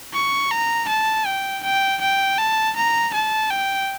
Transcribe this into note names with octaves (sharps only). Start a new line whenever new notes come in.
C#6
A#5
A5
G5
G5
G5
A5
A#5
A5
G5